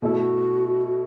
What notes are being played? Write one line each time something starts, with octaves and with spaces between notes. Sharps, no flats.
B2 A3 E4 F#4 A4